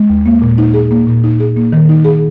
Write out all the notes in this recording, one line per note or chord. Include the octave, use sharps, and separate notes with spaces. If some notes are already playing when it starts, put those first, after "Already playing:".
Already playing: G#3
D#2
A#3
A#2
D#4
G#4
A#3
A#2
D#4
G#4
A#3
D#3
D#4
G#4